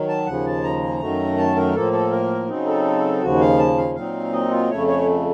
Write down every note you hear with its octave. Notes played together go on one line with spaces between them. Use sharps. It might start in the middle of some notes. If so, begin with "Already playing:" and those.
Already playing: D#3 F#3
A5
D#2 C#3 F3 F#5
A5
A#5
F#2 D#3 F#3 A3
A5
A#4
A2 F3 A#3 A4
A4
A#4
C#3 F#3 C4 D#4
A4
D#2 C#3 F3 F#4
F5
A5
F5
A#2 F#3 C4 D#4 F5
D#5
F4
F2 C#3 A3 C#5
C#5